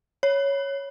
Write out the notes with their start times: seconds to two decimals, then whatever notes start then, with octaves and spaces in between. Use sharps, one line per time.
0.23 C#5